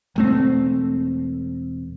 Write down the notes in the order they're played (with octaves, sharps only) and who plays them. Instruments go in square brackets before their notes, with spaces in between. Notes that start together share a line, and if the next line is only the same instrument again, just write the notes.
[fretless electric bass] E1 A3 C4